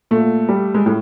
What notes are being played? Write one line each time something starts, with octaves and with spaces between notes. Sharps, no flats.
A#2 A3
G3
G#3
A2